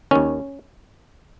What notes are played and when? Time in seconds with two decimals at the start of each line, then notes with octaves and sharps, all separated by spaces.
0.11 D#2 D#3 C#4